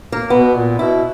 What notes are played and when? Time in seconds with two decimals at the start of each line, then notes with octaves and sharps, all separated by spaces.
0.12 A#3
0.30 B2 B3
0.55 A#2
0.79 B2 E4